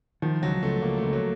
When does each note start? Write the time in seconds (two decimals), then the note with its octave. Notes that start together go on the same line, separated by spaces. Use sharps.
0.22 D#3 F3
0.42 C#2 F#3
0.62 C#2 A3
0.82 C#2 A#3
0.98 C#2 A3
1.13 F#3